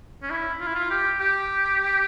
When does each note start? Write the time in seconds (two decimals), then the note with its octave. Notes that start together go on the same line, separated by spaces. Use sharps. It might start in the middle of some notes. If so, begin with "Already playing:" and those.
0.23 C#4
0.31 E4
0.61 F4
0.67 E4
0.75 F4
0.90 G4
1.20 G4